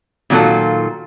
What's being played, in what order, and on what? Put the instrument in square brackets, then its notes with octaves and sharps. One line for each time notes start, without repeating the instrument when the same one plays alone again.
[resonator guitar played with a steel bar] A#2 D#3 F#3 F4 F#4 A4